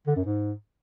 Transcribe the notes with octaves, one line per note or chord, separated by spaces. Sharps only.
D3
F#2
G#2